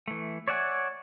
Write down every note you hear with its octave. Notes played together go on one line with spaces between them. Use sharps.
E3 A3
C#5 D5 E5 F#5 G#5